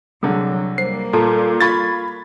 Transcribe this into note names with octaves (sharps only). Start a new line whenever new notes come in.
C2 D3 F#3 G#4
G3 A#3 C5 C7
A#2 F4 A4 A5 A#5
F4 B5 C#6 G#6 A6